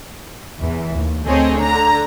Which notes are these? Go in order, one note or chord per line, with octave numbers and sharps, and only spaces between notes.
E2 E3
D#2
D2 C4 G#4 A4 C#5 D#5
D3 A#5